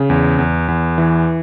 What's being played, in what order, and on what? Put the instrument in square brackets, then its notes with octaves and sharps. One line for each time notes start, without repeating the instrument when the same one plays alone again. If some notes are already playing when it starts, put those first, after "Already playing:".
Already playing: [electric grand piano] C#3
E2
E2
E2
E3